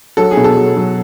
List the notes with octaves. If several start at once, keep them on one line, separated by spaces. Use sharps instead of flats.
F#3 A4
G#4
B2
A4
F#3
F#3